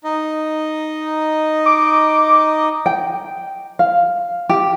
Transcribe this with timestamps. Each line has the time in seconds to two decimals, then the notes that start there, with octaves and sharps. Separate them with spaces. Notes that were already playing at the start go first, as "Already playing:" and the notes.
0.04 D#4 D#5
1.66 D6
2.86 G5
3.79 F5
4.49 G4